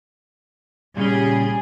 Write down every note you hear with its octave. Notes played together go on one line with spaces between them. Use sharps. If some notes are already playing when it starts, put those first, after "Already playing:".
A#2 C#3 G3 C#4 G#4